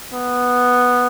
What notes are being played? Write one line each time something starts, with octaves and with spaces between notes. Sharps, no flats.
B3